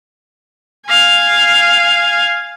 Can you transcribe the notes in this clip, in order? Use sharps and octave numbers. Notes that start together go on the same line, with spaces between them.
F5 G#5